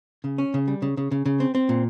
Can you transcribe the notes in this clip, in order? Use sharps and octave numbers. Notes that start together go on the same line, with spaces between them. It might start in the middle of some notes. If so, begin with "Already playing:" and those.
C#3
C#4
C#3
G3
C#3
C#3
C#3
C#3
C4
C4
A#2